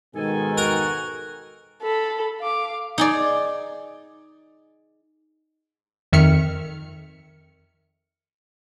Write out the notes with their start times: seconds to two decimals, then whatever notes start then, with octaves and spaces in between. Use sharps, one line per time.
0.14 G#2 B2 D#3 A4 G#5
0.58 F#4 A#4
1.83 A4 B5
2.41 F5 D6
2.98 D#4 G#4 D5
6.13 F2 D#3 E5 F6 C#7